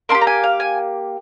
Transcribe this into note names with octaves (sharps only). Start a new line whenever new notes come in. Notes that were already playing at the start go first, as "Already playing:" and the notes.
A#3 D4 C6
G4
A#5
G#5
F5
G#5